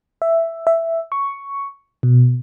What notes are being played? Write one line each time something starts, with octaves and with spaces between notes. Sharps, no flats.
E5
E5
C#6
B2